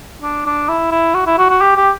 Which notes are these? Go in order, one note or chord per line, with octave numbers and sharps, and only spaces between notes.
D4
D4
E4
E4
F#4
E4
F#4
F#4
G4
G4